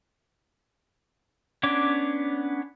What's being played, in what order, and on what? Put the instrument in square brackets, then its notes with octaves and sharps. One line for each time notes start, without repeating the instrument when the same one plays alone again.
[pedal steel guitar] B3 C#4 D4 C#5 D6